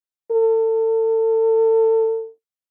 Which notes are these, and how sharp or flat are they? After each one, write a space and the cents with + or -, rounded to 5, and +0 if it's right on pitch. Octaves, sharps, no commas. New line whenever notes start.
A4 +30